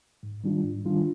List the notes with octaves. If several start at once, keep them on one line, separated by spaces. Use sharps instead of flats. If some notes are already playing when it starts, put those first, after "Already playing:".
G#2
D#3 G3 D4 F4
G#2
D#3 G3 D4 F4